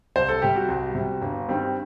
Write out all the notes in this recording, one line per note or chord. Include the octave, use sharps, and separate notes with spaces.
C2 C5
A4
C3 G3 G4
F#4
C2
C3 G3
G1
G2 D#3 G3 C4